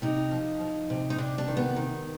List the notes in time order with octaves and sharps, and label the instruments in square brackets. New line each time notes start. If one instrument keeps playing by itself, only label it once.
[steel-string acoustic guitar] C3 D#4
F3
F3
C3
D#4
C3 D4
D4
D#3
B3
D#3